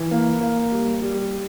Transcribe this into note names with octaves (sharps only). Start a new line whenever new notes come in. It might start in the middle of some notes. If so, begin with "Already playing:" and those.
Already playing: E3
A#3
A#3
G3
G3